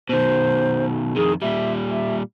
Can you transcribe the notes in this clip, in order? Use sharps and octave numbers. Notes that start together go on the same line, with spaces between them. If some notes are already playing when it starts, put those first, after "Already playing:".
B2 D#3 C5
F2 D#3 G#4
A#2 G3 E5
E5